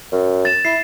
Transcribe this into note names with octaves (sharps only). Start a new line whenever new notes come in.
F#2
A6 E7
E4 C7